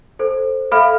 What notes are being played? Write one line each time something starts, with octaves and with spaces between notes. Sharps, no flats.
A4 C5
A4 E5 F5 B5 F6